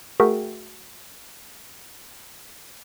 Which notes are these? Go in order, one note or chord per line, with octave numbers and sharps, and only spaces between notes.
A3 F#4 G#4 A#4 E5 G5